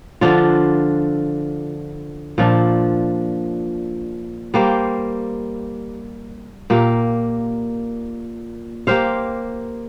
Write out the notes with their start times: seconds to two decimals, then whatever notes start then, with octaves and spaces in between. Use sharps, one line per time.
0.21 D3 F3 D4 F4
2.38 A#2 F3 D4
4.54 G3 A#3 G4 C5
6.70 A#2 A#3 G4
8.87 A#3 G4 C5 F5